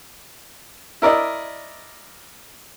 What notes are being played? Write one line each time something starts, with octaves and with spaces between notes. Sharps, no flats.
E4 A#4 D5 D#5